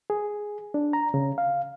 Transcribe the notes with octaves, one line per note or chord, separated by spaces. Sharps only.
G#4
D4
A#5
C#3
F5